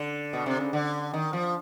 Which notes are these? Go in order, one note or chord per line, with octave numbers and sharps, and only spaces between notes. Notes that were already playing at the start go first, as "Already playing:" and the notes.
Already playing: D3
B2
C3
C#3
D3
D#3
F3